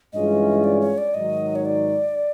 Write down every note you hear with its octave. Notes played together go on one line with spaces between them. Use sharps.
G2 E3 G#3 C#4 F4 D#5
D5
C#5
D5
G#2 D#3 F#3 D#5
C#5
D5